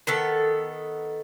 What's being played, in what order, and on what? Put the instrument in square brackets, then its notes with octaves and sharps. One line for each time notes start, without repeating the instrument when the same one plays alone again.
[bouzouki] D#3 B3 A4